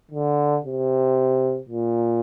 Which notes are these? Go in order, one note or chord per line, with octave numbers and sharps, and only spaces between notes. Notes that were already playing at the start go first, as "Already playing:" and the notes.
D3
C3
A#2